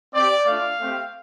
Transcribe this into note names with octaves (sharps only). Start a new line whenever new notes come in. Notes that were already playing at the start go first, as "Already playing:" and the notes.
C4 G4 D5
A3 D4 F4 F5
A3 C4 G4